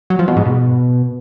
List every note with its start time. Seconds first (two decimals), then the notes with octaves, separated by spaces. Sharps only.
0.10 F#3
0.19 F3
0.28 B2
0.37 G#2
0.45 B2